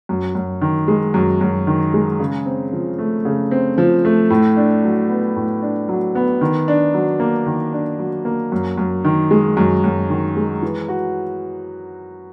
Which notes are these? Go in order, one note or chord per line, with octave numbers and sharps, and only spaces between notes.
F#2
F#2
D#3
G#3
F#2
F#2
D#3
G#3
C#3
C4
F3
A3
C#3
C4
F3
A3
A2
D4
F#3
B3
A2
D4
F#3
B3
D#3
D4
F#3
A#3
D#3
D4
F#3
A#3
F#2
F#2
D#3
G#3
F#2
F#2
D#3
G#3
E3
F#4